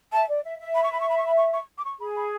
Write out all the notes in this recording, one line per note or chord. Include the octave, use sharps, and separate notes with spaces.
E5 A5
D5
E5
E5
B5
C#6
B5
C#6
B5
C#6
B5
C#6
C#6
D6
C#6
G#4 B5
B5